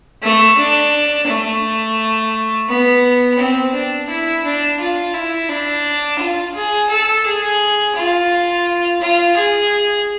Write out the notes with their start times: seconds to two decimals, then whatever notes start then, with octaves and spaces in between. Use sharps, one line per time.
0.22 A3
0.57 D4
1.28 A3
2.69 B3
3.38 C4
3.74 D4
4.09 E4
4.44 D4
4.80 F4
5.14 E4
5.49 D4
6.19 F4
6.55 G#4
6.90 A4
7.26 G#4
7.95 F4
9.01 F4
9.36 G#4